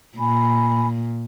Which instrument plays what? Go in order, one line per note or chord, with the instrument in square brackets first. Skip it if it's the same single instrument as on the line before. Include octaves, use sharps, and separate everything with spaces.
[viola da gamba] A#2 [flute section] G#5 B5